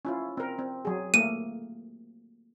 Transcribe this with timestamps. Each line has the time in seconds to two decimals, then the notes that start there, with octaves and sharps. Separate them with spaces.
0.05 C#4 E4 F4
0.37 C4 A#4
0.59 C4
0.85 F#3 G#4
1.14 A3 A#3 D#7